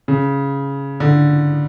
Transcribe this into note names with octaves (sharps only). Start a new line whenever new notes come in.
C#3
D3